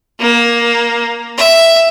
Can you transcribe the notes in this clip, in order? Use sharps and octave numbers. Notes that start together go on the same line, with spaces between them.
A#3
E5